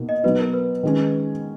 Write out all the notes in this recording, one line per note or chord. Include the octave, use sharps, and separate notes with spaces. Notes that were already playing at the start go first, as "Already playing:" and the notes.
Already playing: B2 A#3 D#4
D#5
B2 F#3 B3 D#4 B4
A#4
B4
D#3 G#3 C#4